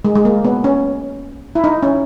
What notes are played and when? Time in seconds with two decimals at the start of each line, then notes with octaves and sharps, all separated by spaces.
0.05 G#3
0.15 G#3
0.25 A#3
0.45 B3
0.64 C#4
1.55 E4
1.64 D#4
1.83 C#4